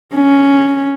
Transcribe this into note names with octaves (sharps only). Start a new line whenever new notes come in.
C#4